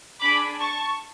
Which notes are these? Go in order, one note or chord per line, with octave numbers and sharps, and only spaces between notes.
D4 G#4 B5 D6
A5 C#6